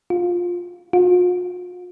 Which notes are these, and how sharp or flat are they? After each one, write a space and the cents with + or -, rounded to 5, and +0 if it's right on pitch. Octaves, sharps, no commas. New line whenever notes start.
F4 +15
F4 +45